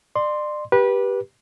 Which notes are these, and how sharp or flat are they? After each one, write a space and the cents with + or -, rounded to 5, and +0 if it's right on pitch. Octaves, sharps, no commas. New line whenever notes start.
D5 +35 C6 +0
G4 +0 B4 -20